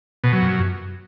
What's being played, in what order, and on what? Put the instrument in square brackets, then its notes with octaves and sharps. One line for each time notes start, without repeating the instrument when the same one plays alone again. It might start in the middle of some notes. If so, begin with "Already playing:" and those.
[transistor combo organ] B2
F#3
F#2